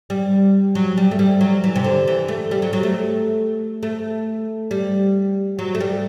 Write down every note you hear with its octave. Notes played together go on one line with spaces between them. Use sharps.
G3
F#3
G3
A3
G3
F#3
E3
C3
D3
E3
A3
G3
F#3
F#3
A3
A3
G3
F#3
A3
G3